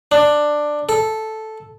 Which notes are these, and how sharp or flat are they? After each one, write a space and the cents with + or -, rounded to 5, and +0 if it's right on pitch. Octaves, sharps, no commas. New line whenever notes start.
D4 +10
A4 -5